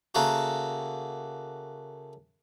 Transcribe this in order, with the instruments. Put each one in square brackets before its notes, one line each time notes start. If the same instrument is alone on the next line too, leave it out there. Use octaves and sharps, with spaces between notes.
[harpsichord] C#3 A3 A#3 F#4